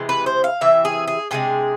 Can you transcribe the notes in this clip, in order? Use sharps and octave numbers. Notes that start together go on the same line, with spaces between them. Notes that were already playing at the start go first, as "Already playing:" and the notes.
Already playing: C3 E3 G#3
B4
C5
F5
C3 E3 E5
G#4
G#4
C3 E3 G#3 D4 G#4